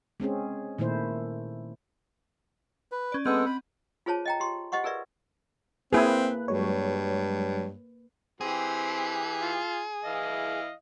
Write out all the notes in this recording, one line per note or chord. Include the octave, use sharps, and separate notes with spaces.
G#3 C4 C#4 G#4
A#2 D#3 A3 E4 C5
B4
C#4 D5
G#3 B3 C4 A4 D#5 F#5
B5
F4 G#4 C5 C#5 A5
D#5 G5 A#5
G4 C6
G4 C5 D#5 F#5 C#6
G#4 A#4 B4 D5 E5
A#3 C4 E4 G#4 B4 F#6
G2 F#3 G#3 C#5
E3 C4 G4 G#4
F4
E3 E4 D#5 F5